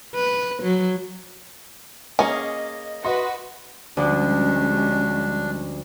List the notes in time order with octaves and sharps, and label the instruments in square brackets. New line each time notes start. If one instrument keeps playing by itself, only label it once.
[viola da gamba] B4
F#3
[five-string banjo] A#3 C#4 G#4 [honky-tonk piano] D#5 [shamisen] G#5
[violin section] F#4 B4 [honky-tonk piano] D#5 C6
[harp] D2 F3 [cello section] G3 G#3 C#4 [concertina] D4